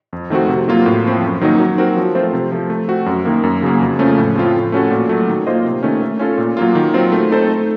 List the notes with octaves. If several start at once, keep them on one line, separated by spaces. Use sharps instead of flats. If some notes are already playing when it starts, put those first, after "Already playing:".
F2
D#3 A3 C4 F#4
C3
F#3 A#3 F4
A2
F3 C4
F#2
D#3 F#3 A#3 D#4
F#3
C4 F#4 A#4
F3
A3 C4 F4 C5
C3
F3 A3
A3
C4 F#4
F#2
D#3 A#3
F#2
C#3 F#3 A#3
F2
C#3 F3 A3 C#4
A2
F3 C4 F4
A2
A3 C#4 F#4 A4
A#2
F#3 A3
D#3
A#3 F4 C5 D#5
C3
D#3 A3 C#4
A3
C#4 F4 A4
A#2
F#3 A#3 F4
D#3
F#3 C4 F4
A3
C4 D#4 A4 C5
A3